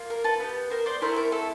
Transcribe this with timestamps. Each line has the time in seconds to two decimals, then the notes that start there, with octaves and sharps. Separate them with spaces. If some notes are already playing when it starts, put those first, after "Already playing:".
Already playing: A#3 F4
0.10 A#4
0.24 A4 B4
0.40 B3 D#4 G4
0.70 A#4 C5
0.86 C5 D5
1.02 A3 C4 E4 A#4 C5
1.16 A#4
1.32 A4